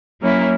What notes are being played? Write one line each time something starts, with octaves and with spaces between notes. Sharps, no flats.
F#3 A#3 C#4 E4